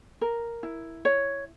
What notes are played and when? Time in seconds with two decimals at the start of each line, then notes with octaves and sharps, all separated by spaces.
0.21 A#4
0.63 E4
1.05 C#5